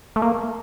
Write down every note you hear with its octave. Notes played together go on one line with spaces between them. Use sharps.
A3
A#3